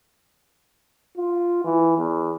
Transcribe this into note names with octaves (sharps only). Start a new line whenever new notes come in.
F4
E3
E2